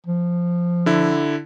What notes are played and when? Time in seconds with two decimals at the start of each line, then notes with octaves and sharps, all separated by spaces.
0.06 F3
0.86 D3 E4